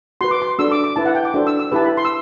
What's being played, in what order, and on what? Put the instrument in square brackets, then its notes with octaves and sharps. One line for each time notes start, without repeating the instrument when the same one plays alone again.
[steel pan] F#4 B4 C6
D6
C6
D4 F#4 A4 E6
D6
D6
E4 B4 A5
F#5
G5
D6
D4 F#4 A4 C5
E6
E6
E4 G4 B4 A5
B5
C6
E6